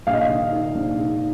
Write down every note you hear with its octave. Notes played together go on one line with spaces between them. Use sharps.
A#1 F5
D#5
F5
D#3
D#3
A#1
G#2